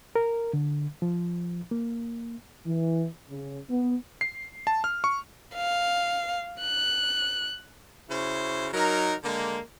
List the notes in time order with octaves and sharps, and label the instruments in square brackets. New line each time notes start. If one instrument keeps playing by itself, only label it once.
[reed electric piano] A#4
D3
F3
A#3
[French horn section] E3
C#3
B3
[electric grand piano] C7
A5
F6
C#6
[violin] F5
F#6
[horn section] C#3 E4 F#4 C5
F#3 D#4 A#4
D3 G#3 A#3